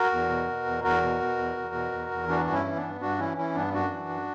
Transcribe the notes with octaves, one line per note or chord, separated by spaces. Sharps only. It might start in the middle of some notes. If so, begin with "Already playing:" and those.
Already playing: F#4 A#4
E2
B2
B2
E2
E2 F#4 A#4
B2
B2
E2
E2
B2
E2
E2
E3 D4 F#4
G2 F#4
C#4 E4
E3
B3 D4
G2
G2 D4 F#4
E3 C#4 E4
E3 C#4 E4
G2 B3 D4
F#2 D4 F#4
E3
F#2